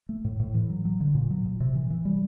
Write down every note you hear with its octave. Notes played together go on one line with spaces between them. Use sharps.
A3
A2
A2
E3
F#3
F#3
D3
A#2
F#3
A#2
C3
E3
E3
G3